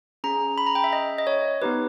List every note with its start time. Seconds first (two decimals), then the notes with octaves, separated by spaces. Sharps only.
0.24 C#4 G#4 A#5
0.58 B5
0.67 A#5
0.75 G5
0.84 E5
0.93 D#5
1.18 D#5
1.27 C#5
1.62 B3 D#4 G4 B4